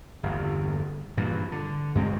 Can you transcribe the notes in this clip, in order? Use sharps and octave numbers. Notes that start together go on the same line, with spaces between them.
G1 E2
G2 A#2 E3
D3
G2 G#3 C4